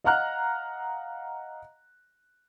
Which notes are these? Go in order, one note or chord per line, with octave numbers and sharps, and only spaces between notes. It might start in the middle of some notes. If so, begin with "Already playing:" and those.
D#5 F5 F#5 A#5 F6 F#6